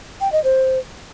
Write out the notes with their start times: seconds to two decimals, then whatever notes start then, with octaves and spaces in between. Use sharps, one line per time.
0.21 G5
0.32 D#5
0.44 C5